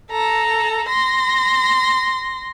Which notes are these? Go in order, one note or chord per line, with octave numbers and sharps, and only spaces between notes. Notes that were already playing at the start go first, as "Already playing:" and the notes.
A4 A#5
C6 A#6